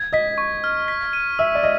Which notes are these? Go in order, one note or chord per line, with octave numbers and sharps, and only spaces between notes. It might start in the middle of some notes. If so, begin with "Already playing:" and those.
Already playing: G#6
D#5 B6
C#6
F6
B6
D#7
E5 E6
D5
D#5